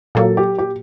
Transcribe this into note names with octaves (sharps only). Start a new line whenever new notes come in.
A#2 F#3 A#3 A4
G4
G4